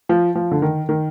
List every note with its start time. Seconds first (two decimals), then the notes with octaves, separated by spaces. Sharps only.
0.09 F3
0.35 F3
0.51 D3
0.62 D#3
0.89 D#3